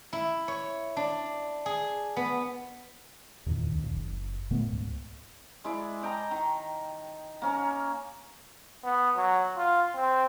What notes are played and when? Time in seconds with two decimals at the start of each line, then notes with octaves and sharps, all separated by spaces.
0.13 E4
0.48 C#5
0.97 D4
1.66 G#4
2.16 B3
3.46 E2 G2 A#2 D#3
3.72 C#2 F#2 A#2 D#3
3.95 F#1
4.51 A#2 D3 A3 B3
4.67 C#2 G#2
5.64 G#3 E4 D5
6.03 D#5 G5 A5 A#5
6.31 D#3
7.42 A#3 C#4 A#4
8.84 B3
9.16 F#3
9.57 F4
9.95 C4